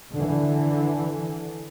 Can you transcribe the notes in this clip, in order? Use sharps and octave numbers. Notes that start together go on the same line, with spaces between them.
D3 E3